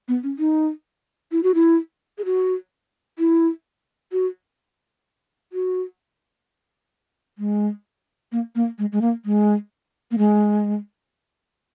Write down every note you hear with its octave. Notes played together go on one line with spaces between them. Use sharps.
B3
C#4
D#4
E4
F#4
E4
G#4
F#4
E4
F#4
F#4
G#3
A#3
A#3
G#3
G#3
A#3
G#3
A#3
G#3